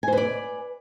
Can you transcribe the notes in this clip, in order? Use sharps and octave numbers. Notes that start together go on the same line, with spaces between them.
B4 C5 D5 G#5